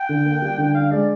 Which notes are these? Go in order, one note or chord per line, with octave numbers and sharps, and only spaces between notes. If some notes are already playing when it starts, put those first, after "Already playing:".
Already playing: G5
D3
A#3
G3
D3
D4 F5
G#3 D5